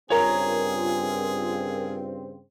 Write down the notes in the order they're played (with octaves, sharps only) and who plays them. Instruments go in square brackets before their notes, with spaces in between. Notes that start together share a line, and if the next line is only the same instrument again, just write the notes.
[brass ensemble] G2 C#3 C4 [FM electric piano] F4 A#4 [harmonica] G#4 [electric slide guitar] C#5 A#5